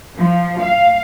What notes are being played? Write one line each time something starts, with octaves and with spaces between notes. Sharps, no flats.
F3
F5